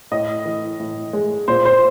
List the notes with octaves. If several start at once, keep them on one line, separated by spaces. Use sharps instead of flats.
A2 D#5
E3
A2
G#3
A#2 C5
C5